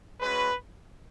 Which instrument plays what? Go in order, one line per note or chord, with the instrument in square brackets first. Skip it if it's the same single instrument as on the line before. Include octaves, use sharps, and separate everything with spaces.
[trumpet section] G#3 C#4 F#4 B4